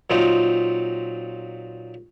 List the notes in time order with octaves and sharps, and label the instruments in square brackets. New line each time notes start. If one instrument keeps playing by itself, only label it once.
[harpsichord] A#2 F#3 C4 D#4